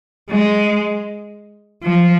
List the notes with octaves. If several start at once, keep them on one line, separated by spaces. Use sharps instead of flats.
G#3
F3